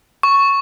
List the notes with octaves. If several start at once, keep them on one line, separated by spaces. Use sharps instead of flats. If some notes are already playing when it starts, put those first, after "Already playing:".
C#6